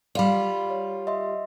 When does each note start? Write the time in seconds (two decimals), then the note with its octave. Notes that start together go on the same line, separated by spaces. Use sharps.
0.15 G3 F4 D5 F5 B5
0.70 C#5
1.07 D#5 E5 C6